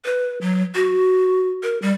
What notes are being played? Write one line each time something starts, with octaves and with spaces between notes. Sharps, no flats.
B4
F#3
F#4
A#4
G3